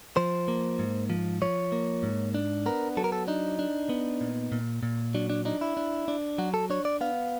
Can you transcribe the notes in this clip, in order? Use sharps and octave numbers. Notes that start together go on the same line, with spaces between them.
F3 C5
A#3
G#2
F3
F3 C#5
A#3
G#2
D4
B3 A#4
F#3 A4
A#4
A4
D4 D#4
D4
B3
A#2
A#2
A#2
F#3 D4
D4
D4 D#4
E4
D4
D4
F#3 F#4
A4
D4 C#5
D5
B3 F5